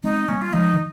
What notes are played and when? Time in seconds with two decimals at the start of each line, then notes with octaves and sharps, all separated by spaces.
0.03 G#3 C4 D#4
0.28 G3 A#3 C#4
0.41 F4
0.53 F3 G#3 D#4
0.73 D#3